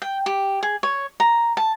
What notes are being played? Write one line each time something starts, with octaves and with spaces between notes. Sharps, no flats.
G5
G4
G#4
C#5
A#5
A5